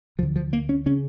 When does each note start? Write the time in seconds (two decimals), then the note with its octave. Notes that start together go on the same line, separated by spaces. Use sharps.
0.18 D2 F3
0.22 D3
0.36 F3
0.53 A#3
0.69 C#4
0.86 C#3 C#4